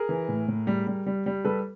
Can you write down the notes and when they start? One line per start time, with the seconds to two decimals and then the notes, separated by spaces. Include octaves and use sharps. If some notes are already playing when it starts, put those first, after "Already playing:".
Already playing: G#4 A#4
0.09 E3
0.29 A2
0.48 A2
0.67 G3
0.87 G3
1.07 G3
1.26 G3
1.45 G3 A4 B4